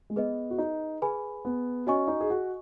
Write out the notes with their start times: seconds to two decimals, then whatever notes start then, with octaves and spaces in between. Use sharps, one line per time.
0.10 G#3
0.16 B3 G#4 B4 D#5
0.50 F#4
0.58 D#4
1.02 G#4 B4 G#5 B5
1.45 B3
1.87 C#4 F#4 D#5 G#5 C#6
2.08 D#4
2.21 G#4
2.30 F#4